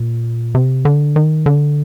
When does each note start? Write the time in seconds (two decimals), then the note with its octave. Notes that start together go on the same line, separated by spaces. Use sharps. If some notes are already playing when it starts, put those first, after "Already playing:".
Already playing: A#2
0.55 C3
0.85 D3
1.16 D#3
1.46 D3